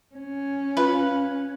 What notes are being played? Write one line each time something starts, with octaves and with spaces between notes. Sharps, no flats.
C#4
F4 B4